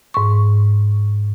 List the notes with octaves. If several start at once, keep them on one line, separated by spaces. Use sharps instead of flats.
G#2 C#6